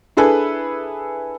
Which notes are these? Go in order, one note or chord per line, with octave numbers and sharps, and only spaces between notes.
D4 E4 G#4 A4 B4